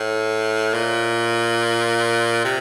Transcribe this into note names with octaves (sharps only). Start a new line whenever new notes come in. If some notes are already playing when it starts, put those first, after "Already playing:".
Already playing: A2
A#2
C3